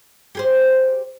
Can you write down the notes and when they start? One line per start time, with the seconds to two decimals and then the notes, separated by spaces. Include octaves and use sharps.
0.35 G4 G#4 C5